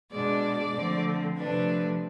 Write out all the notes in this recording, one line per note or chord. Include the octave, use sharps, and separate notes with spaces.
B2 G#3 D4 D5
D3 F3 A3 C4
C3 F3 A3 D4 B4